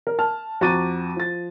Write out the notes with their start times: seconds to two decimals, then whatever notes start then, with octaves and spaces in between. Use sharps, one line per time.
0.07 A#4
0.19 A5 F6
0.61 F2 F#4 A#5 D6 A6 D#7
1.16 F3 A6